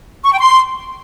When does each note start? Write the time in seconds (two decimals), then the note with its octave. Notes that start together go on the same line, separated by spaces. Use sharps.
0.24 C#6
0.32 G5
0.39 C6